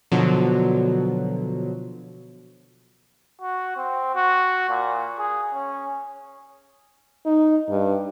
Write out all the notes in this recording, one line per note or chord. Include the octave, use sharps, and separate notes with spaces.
B2 D3 F3 F#3
F#4
C4
F#4
A#2
G#4
C#4
D#4
G2